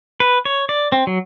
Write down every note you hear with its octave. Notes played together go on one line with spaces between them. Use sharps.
B4
C#5
D5
C4
F#3